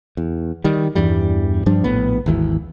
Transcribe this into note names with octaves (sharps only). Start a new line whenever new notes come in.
E2
D#3 G3
E2 G2 E3 G3
G2 F3 G3 D4
A#1 A2 B3
G#1 D#2 E3